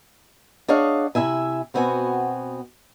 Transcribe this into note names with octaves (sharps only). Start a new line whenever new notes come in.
D4 G#4 C#5 D#5 F5 F#5
C3 E4 E5 G#5
B2 B3 C4 F#4 G#5